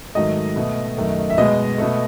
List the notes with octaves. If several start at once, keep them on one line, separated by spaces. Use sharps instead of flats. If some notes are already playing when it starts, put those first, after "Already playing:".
G#2 D#3 F#3 A3 D#5
B2 A3
F#2 D#3 A3
E5
B2 G#3 D#5
B2 A3